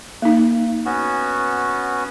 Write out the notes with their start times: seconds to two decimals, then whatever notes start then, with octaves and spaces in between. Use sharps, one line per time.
0.22 A#3 D#4
0.86 B3 C#4 F#4